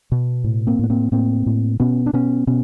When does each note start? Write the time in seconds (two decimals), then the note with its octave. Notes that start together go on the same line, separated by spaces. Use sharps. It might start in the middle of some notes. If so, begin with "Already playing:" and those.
0.12 B2
0.44 A2
0.67 A#3 C4
0.79 A2 B3
0.90 A#3 C4
1.12 A2 A#3 C4
1.46 A2
1.80 B2 B3 C#4
2.06 D4
2.13 B2 B3 C#4
2.47 B2 B3 C#4